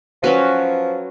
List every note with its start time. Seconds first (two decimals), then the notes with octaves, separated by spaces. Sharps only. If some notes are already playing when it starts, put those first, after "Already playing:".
0.23 F3 F#3 C#4 F#4 B4